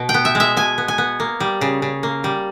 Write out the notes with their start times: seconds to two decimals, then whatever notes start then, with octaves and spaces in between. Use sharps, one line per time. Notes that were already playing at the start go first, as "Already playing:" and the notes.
Already playing: B2
0.09 G5
0.14 B3
0.25 E5
0.35 G#3 E5
0.57 B2 G#5
0.78 B3
0.88 G#5
0.98 B3
1.20 A#3
1.40 G3
1.61 C#3
1.82 C#3
2.03 A#3
2.24 G3